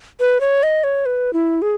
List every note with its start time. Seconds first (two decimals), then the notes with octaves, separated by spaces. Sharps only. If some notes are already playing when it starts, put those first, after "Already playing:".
0.20 B4
0.41 C#5
0.63 D#5
0.84 C#5
1.06 B4
1.33 E4
1.62 G#4